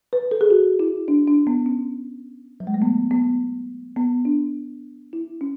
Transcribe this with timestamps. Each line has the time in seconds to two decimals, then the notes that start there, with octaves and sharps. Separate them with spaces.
0.13 B4
0.31 A4
0.41 G#4
0.50 F#4
0.79 E4
1.08 D4
1.28 D4
1.47 B3
1.66 C#4
2.60 F#3
2.67 G#3
2.74 A3
2.82 B3
3.11 B3
3.96 B3
4.25 D4
5.13 E4
5.41 C#4